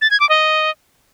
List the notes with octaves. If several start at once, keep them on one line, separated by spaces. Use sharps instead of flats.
A6
G#6
D6
D#5